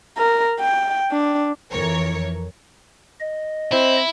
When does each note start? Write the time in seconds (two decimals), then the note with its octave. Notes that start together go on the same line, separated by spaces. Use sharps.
0.17 A#4
0.60 G5
1.12 D4
1.71 F2 E3 A#4 C#5
3.20 D#5
3.72 C4 E4